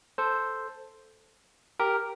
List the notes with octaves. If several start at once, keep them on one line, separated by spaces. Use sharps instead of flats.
A4 C5
G4 A#4